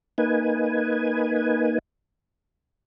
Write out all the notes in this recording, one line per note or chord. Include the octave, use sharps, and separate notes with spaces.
A#3 D#4 B4 G#5